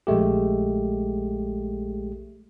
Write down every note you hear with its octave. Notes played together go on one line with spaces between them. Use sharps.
A#1 G#3 A3 G4